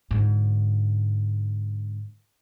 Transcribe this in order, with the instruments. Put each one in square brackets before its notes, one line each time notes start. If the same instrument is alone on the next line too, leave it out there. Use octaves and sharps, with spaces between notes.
[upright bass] G#2 D3